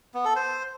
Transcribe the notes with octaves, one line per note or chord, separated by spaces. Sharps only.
B3
A4
C5